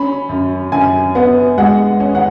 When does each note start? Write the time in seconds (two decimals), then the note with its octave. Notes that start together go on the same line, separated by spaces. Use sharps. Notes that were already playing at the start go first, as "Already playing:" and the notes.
Already playing: C#4 B5
0.29 F#2
0.72 F#2 G#5
1.15 B3
1.58 G#3 F#5
2.00 C#4
2.15 F#5